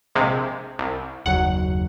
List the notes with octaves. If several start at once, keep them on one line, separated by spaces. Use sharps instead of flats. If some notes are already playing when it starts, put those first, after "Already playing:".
A#1 C3 G#3
C2
F#1 D#2 F#3 F#5